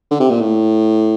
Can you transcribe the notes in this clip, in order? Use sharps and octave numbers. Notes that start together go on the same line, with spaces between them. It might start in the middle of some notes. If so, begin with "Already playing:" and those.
D3
C3
A#2
A2